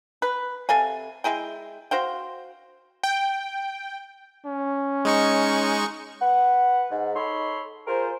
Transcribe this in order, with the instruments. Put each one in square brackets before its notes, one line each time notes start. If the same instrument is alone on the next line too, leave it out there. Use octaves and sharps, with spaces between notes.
[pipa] B4
C3 A4 F5 G#5
G#3 E4 G#4 G5
F#4 C5 F5 G5
[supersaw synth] G5
[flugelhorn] C#4
[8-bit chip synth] G#3 D#4 C#6
[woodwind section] B4 F#5
G#2
D#4 A4 C#5 B5 C6
F4 G#4 A#4 C5